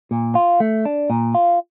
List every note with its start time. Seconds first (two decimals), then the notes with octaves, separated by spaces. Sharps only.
0.11 A#2
0.35 F4
0.60 A3
0.85 D4
1.10 A#2
1.35 F4